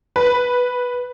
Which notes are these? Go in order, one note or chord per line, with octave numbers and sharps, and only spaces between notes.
B4